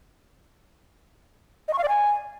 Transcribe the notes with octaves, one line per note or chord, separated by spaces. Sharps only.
D#5
C#6
F5
D5
G#5